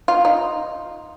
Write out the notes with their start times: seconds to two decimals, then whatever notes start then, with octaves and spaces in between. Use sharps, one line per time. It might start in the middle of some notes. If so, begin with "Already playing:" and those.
0.08 F4
0.25 D#4